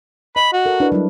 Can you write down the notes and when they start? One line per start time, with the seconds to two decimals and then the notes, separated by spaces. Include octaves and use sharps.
0.36 D#5 B5
0.53 F#4
0.66 A4 A#4
0.80 D4 E4 B4
0.92 F#3 G3 E4